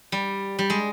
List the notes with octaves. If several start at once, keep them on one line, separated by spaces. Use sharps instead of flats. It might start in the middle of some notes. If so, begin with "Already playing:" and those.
G3
G3
G#3